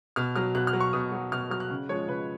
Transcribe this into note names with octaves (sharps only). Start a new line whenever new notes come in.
B2 F6
F#3 F6
B2 F#6
F6
F#3
C#6
B2 D#6
F#3
B2 F6
F#3 F6
F#6
C#3
F3 G#3 C#5
C#3 B4